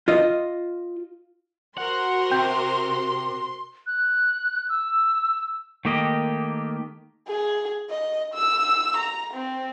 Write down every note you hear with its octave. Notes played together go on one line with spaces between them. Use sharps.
F4 D#5
F#4 A#4 C5 F#5 C6
C3 G5 G6
F#6
E6
D#3 A3 A#3 G4 D#5
G#4
D#5
E6
A#5
C4